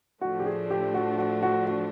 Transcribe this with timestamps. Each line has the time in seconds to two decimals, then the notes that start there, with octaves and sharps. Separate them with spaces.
0.21 A2 F3 A3 D4 F#4
0.40 G4
0.46 G#4
0.70 G4
0.94 F#4
1.18 F#4
1.42 F#4
1.67 F#4